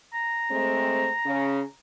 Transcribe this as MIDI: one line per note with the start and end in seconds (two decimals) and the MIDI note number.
0.14 1.75 82
0.50 1.09 56
0.50 1.09 57
0.50 1.09 60
1.25 1.61 49
1.25 1.61 61